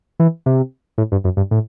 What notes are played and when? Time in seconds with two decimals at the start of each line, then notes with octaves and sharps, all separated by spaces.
0.20 E3
0.46 C3
0.98 A2
1.12 G2
1.24 F#2
1.37 G2
1.51 A2